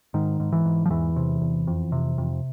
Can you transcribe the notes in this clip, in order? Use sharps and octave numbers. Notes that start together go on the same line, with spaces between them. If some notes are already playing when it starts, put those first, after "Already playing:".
G#2 D#3
G#2
E3
G#2
F3
E2 E3
C3
E2
F2
C3
F2